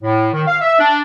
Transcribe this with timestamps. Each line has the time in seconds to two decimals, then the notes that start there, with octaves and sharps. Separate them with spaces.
0.03 A2
0.33 D#3
0.47 F5
0.61 E5
0.79 D4